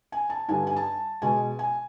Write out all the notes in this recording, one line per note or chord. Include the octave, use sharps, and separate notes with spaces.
G#5
A5
G2 D3 G3 G#5
G#5
A5
B2 G#3 G#5
G#5